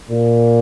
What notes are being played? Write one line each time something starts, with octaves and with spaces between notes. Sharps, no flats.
A#2